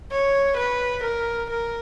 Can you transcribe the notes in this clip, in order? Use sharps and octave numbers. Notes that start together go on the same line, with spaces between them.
C#5
B4
A#4
A#4